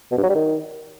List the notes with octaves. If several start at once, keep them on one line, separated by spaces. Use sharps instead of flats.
B2
G2
F#3
G3
D#3